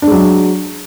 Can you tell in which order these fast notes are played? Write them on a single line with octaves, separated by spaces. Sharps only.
D4 G#3 F#3